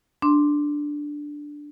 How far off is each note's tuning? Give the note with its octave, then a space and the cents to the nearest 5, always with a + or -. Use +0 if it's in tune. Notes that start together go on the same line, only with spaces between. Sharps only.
D4 +0 C6 +0